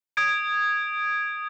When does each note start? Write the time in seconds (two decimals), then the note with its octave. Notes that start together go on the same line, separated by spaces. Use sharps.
0.17 D#6 G#6 D7